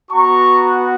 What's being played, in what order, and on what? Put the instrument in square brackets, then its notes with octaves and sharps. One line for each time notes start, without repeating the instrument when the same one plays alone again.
[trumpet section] B3 F#4 A#5 C#6